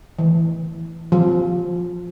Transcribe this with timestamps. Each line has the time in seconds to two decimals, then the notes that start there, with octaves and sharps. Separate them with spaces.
0.19 E3
1.12 F3